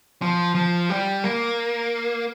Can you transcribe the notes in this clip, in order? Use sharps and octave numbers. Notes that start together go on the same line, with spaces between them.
F3
F3
G3
A#3